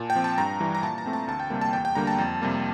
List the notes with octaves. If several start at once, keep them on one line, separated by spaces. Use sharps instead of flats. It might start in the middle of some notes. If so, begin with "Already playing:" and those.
Already playing: A#2 A5
G5
F3 C4
A5
G2 A#5
E3 G3
A#5
A#2 A5
A#5
A3 C4
A5
D2 A5
G5
C3 G3 A#3
A5
E2 G5
G5
D3 G3 A#3 A#5
A5
F2
C3 G3 A#3